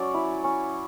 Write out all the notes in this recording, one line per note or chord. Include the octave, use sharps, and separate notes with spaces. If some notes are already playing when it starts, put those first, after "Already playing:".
Already playing: F#3 C#4 D5
E4
C#4